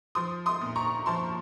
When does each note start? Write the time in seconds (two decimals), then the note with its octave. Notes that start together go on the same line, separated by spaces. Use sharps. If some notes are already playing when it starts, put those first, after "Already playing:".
0.15 F3 C6 D#6
0.46 C6 D#6
0.61 A#2
0.76 A#5 C#6
1.06 F3 A5 C6